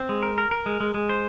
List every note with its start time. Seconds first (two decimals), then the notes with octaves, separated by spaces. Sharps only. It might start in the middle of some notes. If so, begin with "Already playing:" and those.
Already playing: C4
0.09 G#3
0.23 A#4
0.38 A#4
0.51 A#4
0.66 G#3
0.80 G#3
0.94 G#3
1.09 C5